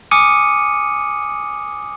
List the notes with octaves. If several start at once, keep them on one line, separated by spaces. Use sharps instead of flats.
G#5 D6 D#6 F6 C#7 D#7